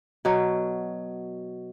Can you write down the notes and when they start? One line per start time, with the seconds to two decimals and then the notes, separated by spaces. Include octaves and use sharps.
0.25 B2 F#3